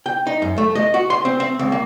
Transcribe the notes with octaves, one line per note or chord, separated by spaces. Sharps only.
G5
D#4
F#2
A3
D#5
F#4
C6
C4
C4
C#2
A#3